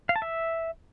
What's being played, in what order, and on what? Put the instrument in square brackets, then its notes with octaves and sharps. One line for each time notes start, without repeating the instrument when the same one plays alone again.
[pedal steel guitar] F5
A5
E5